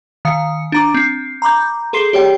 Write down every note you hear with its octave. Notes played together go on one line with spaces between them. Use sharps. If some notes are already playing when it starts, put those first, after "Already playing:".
D#3 F5 C#7
D4 A#5 D6
C4 C7
A#5 B5 D6 G6
G#4 A4 C6 C7 G7
G4 C#5 D5 G5